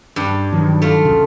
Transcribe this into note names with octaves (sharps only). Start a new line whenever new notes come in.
G2
D#3 F#3
A3 F4
D2 C#3